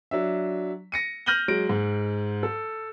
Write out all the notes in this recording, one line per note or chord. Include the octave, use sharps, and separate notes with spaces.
F#3 D4 E5
A#6 C#7 D#7
F6 G6 A#6 D#7 F#7 G7
F#3 G#3 A#6 D7
G#2
A4